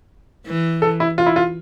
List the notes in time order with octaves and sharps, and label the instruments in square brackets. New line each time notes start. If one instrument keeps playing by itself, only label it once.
[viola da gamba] E3
[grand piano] A4
E4
F4
E4
F4